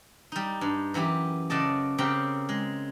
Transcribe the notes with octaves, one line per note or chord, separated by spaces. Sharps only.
G3 D#4
G2
F#2 E3 G4 B5
C#3 F#4 D5 D#5 A5
C#3 C4 G4 A#4 G5 B5
G#3